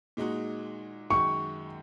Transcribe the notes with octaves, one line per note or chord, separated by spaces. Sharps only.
A#2 G#3 D#4 F#4
F#2 D#3 G#3 F#4 C#6